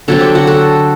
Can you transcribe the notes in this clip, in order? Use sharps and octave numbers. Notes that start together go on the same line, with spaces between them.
D3 F#3 C4 A4
G4
F#4
A4